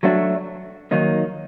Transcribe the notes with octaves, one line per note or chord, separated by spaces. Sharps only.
F#3 A3 D4 F#4
D#3 F#3 A#3 D#4